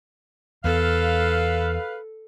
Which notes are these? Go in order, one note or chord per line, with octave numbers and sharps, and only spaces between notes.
E2 B3 A4 B4 F5